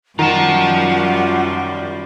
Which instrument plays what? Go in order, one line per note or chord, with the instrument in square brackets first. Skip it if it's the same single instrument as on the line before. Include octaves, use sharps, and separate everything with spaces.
[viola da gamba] F#2 F3 G3 [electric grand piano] D#3 A#5 [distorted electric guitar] F4 A5 [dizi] F#5